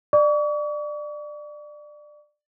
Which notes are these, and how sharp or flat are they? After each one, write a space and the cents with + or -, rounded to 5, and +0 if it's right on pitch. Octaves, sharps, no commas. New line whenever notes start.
D5 +20 C#6 +45